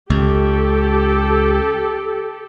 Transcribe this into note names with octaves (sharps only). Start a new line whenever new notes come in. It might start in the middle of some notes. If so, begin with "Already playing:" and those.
C#2 G4 A4